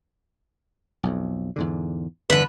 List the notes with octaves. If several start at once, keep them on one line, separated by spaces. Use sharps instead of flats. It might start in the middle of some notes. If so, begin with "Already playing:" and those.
B1 F2
E2 G#2 D3
G1 E2 D3 B4